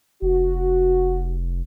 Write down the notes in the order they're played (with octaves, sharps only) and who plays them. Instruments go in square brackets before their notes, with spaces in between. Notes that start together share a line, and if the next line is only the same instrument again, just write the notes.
[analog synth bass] F1 [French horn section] F#4